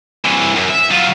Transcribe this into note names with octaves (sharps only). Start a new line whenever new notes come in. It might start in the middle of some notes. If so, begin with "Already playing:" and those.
C2 E3
F#2
E5
F#3 F4